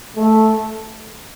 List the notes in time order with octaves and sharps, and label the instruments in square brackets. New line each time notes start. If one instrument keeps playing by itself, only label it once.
[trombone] A3